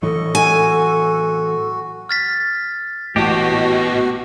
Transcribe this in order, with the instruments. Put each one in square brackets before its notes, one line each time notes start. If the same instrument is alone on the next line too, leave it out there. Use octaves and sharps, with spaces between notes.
[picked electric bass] A2 E3 F#3 [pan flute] A4 [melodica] D#5 C#6
[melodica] F#4 [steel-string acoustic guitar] G#5
[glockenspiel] F6 A6 B6
[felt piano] A1 A5 [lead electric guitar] B3 D#5 [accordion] F#4 [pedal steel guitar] G4